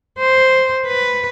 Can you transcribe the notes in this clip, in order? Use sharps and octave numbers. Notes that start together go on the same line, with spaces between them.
C5
B4